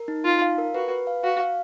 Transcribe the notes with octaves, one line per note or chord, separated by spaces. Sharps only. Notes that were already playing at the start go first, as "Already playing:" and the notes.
Already playing: A#4
D#4
D#4 F4
F5
A#4
F#4 B4
B4
F5
F#4 F5
F5